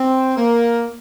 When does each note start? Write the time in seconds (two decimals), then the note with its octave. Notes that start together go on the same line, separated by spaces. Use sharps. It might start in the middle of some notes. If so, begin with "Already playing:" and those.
Already playing: C4
0.35 A#3